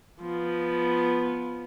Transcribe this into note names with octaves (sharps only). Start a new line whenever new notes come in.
F3 B3